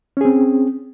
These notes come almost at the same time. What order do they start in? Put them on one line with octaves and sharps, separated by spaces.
C#4 G#4 C4